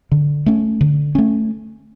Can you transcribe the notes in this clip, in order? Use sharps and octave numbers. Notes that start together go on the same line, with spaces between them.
D3
A3 C#4
D3
A3 C#4